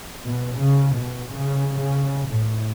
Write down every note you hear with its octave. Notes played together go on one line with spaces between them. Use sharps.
B2
C#3
B2
C#3
C#3
A2